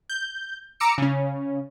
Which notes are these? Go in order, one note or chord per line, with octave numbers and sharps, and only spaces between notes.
G6
A#5 D6 E6 C#7
C#3 C#4